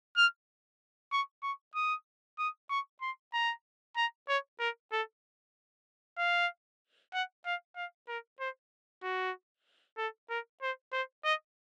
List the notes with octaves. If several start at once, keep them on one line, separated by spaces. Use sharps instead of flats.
F6
C#6
C#6
D#6
D#6
C#6
C6
A#5
A#5
C#5
A#4
A4
F5
F#5
F5
F5
A#4
C5
F#4
A4
A#4
C5
C5
D#5